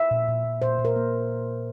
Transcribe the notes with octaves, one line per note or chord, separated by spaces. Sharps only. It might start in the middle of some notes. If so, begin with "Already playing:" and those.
Already playing: E5
A#2
A#2
A#2
A#2 C5
A#2
A#4
A#3